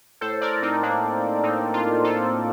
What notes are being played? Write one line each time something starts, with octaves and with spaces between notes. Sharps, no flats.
A2 A4 C5
A#4 D5
C4 D#4
A2 A#3 D4
A2 C4 D#4
D4 F4
A2 F4 A4